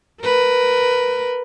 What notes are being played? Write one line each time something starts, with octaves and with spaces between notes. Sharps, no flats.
A#4 B4